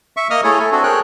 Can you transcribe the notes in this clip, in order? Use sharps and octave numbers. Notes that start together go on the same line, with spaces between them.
E5 C#6
A#3 D#5 D#6 F6
A3 E4 G#4 A4 C#5
A4 G#5
C4 D4 F#4 A4
G#4 A#4 C#5 G5 F#6